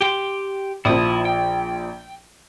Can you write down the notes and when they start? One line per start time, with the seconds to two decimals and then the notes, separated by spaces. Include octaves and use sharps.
0.01 G4 G5 C6
0.85 A#1 F3 E4 D#6
1.25 G5